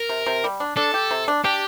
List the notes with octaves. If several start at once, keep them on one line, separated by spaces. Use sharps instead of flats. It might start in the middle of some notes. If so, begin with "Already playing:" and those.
Already playing: A#4
C3
C3
G3
D4
D4 A4
G4
C3
D4
D4 G4